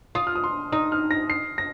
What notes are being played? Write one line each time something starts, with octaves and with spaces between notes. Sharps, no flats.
F4 D#6
F6
D#6
C6
D#4 D#6
F6
A#6
C7
A#6